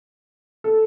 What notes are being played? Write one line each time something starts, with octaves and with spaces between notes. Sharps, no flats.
A4